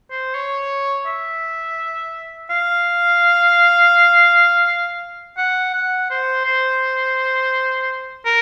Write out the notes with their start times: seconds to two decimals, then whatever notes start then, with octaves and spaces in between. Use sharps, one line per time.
0.11 C5
0.35 C#5
1.06 E5
2.50 F5
5.38 F#5
5.74 F#5
6.10 C5
6.45 C5
8.26 A#4